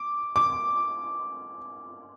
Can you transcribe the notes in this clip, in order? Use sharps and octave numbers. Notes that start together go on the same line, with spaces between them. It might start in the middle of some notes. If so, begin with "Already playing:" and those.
Already playing: D6
D6